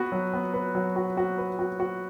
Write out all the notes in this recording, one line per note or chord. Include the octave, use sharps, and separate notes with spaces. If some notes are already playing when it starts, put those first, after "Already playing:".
Already playing: B3 F#4 B4
F#3
B3
B4
F#3
F#4
F#4
B4
F#4
F#4